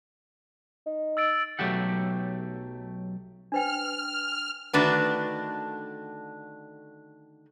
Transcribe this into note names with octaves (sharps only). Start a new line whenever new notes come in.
D#4
E6 A6 D7
B1 F#3 A3 G4 F#5
D4 B4 G5 F6
D3 D#3 A3 D4 F#4 B4